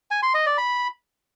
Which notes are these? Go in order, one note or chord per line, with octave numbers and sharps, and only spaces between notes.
G#5
C6
D#5
D5
B5